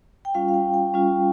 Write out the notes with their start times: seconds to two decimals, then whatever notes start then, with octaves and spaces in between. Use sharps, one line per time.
0.25 G5
0.34 G3 C#4 F4 F5
0.48 F5
0.54 G5
0.74 G5
0.94 G3 C#4 F4